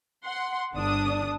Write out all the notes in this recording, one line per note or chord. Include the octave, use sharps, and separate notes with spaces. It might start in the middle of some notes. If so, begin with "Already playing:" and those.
F#5 C6
G1 D3 D4 A5 D#6